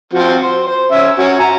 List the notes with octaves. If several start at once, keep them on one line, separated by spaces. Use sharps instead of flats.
F3 C4 F#4
C5
C5
C#4 E5
C#4 F#4
G#5 A#5